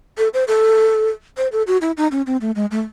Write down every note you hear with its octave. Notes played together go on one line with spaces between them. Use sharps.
A4
C5
A4
C5
A4
F#4
E4
D#4
C#4
C4
A3
G#3
A3